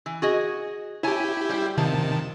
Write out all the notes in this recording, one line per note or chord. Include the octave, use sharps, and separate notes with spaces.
E3
F#4 G#4 D#5
E4 G4 C#5 G#5 A5
G3 C5 G5
C3 D#3 F3 A5